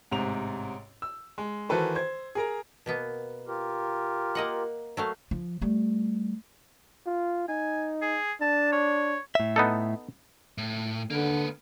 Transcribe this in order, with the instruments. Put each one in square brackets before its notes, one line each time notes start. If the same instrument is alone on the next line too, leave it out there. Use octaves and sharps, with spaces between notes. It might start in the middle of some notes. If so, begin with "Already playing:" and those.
[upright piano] A1 G#2 C3 F7
E6
G#3
D#3 E3 F#4 A4 B4 C5
C5 G#6
G#4 A#4 A#5
[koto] B2 A#3 B3
[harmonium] F4 G4 A#4
[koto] A#3 D#5 F#5
F#3 A3 F5
[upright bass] F3
G3 A3
[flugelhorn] F4
[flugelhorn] D#4 [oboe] G#5
[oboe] G#4
[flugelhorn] D4 [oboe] A5
[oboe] C#5
[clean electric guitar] A2 E5
[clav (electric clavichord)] B3 D#4 A4
[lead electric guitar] A2
[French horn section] D3 [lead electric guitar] A#3 B4